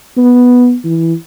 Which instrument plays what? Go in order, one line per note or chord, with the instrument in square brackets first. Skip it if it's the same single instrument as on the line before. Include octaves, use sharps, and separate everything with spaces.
[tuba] B3
E3